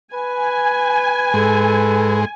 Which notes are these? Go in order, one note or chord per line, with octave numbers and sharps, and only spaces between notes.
B4 G#5
G#2 G#3 A4